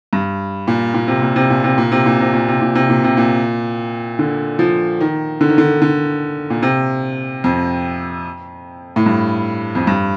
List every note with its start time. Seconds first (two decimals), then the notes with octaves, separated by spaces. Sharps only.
0.13 G2
0.67 A#2
0.94 A#2
1.08 C3
1.22 A#2
1.36 C3
1.50 A#2
1.64 C3
1.78 A#2
1.92 C3
2.06 A#2
2.20 C3
2.34 A#2
2.48 C3
2.62 A#2
2.75 C3
2.90 A#2
3.04 C3
3.17 A#2
4.19 D3
4.59 F3
5.01 D#3
5.41 D3
5.49 D#3
5.58 D3
5.82 D3
6.50 A#2
6.63 C3
7.44 F2
8.96 A2
9.06 G2
9.75 F2
9.87 G2